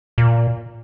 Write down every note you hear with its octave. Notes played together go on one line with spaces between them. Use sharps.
A#2